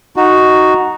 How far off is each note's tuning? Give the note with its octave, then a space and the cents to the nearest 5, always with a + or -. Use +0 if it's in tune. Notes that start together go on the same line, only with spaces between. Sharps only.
D#4 +0 F#4 +0